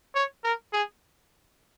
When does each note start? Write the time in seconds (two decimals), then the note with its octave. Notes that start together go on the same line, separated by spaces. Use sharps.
0.15 C#5
0.44 A#4
0.73 G#4